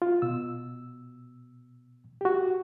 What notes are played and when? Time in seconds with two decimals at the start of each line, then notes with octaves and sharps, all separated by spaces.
0.02 F4
0.22 B2 E6
2.21 F#4 G4